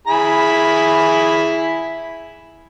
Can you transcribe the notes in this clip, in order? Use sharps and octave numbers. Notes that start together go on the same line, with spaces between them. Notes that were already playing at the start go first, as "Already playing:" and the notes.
E4 G#4 B5